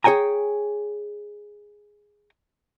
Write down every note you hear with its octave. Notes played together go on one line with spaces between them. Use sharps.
G#4 C#5 G5 G#5 A#5